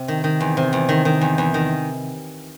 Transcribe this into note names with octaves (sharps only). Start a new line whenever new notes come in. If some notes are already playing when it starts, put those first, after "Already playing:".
Already playing: C3
D#3
D#3
E2
C3
E2
D#3
D#3
E2
E2
D#3